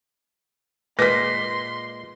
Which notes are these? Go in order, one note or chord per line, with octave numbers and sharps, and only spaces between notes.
A#2 G#3 B4 C6 D6 A#6 B6